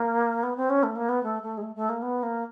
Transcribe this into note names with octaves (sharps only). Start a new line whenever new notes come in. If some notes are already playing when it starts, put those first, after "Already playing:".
Already playing: A#3
B3
C4
C#4
A3
A#3
B3
A3
A3
G#3
A3
A3
A#3
B3
A#3